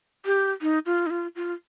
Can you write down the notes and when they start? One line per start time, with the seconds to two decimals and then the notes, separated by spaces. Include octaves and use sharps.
0.26 G4
0.62 D#4
0.86 F4
1.06 D#4
1.10 F4
1.36 F4